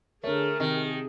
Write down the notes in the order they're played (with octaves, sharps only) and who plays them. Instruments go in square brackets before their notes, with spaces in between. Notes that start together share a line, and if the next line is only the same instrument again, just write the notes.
[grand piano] D3 C#5 [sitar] A3 [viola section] G#4 [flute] A#4
[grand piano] C3 [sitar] D#3